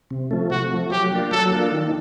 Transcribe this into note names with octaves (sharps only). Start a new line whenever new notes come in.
C3
F3 A3
C3 F#4
F3 A3
F#3 G4
A#3 D4 F4
F#3 A4
A#3 D4 F4
D#3